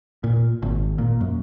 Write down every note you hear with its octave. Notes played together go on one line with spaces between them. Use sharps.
A#2
G#1
A#2
F#2